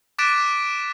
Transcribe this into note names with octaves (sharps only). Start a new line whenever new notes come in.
D6 F#6 A6 B6 D7 E7